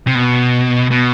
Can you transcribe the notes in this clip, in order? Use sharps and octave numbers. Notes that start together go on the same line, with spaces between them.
C3
B2
B2